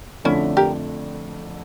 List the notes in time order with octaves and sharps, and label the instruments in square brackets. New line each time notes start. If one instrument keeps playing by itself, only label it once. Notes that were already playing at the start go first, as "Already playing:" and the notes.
[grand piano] F2 D3 F3 A3 D4 [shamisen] C#4 E4
[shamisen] G4 A#4